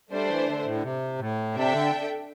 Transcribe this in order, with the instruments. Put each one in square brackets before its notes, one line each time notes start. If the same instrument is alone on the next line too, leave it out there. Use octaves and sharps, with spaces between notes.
[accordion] G3 [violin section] A3 D4 C5
[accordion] E3
D3
A2
D3
C3
A2
[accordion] C3 [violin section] D4 A4 E5 G5
[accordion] D3